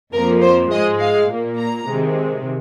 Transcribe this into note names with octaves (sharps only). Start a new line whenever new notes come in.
F2 F3 A#3 A#4
C5
G#2 G#3 D#5
F5
A#2 A#3
A#5
C3 D#3 G#3